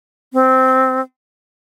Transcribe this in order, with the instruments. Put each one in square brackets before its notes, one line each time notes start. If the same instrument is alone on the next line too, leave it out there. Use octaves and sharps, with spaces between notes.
[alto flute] C4